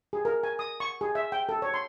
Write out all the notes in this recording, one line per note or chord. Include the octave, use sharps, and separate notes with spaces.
G#4
A#4
G#5
D#6
C#6
G#4
E5
G5
A4
C#5
C6